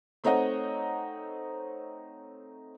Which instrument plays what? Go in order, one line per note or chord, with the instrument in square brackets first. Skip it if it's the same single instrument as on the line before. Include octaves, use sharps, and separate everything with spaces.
[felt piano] A3 C4 D#4 C#5 D#5 F#5